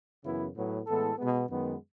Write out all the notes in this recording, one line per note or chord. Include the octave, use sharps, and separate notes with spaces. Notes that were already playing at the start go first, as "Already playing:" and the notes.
F#2 C#3 E3 B3 E4
A2 F#3 B3
A2 E3 G#3 B3 A4
B2 G#3 B3
F#2 D#3 G#3 B3